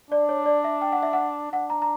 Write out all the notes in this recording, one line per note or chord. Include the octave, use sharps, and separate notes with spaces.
D4 D5
C#5
D5
E5
G5
F#5
E5
F#5
D4 F#5
A#5
A#5